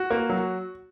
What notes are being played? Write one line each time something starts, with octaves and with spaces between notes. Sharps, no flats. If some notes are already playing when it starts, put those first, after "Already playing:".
Already playing: F#4
A#3
F#3